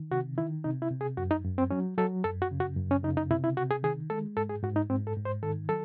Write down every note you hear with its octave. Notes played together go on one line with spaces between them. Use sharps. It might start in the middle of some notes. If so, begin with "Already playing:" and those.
Already playing: D#3
C3 F#4
D#3 E4
C3 D#4
E4
C3
G#4
F#2 F#4
D#4
F#2
C4
F#3 C#4
F#3 A4
F#2 A4
F#4
C#3
F#4
F#2
C#4
C#3 D#4
D#4
C3 E4
E4
C3 F#4
G#4
D#3 G#4
G#3 A4
G#2 A4
G#4
G#2 F#4
D#4
G#2 C4
A4
G#2
C5
D#3 A4
F#3 A4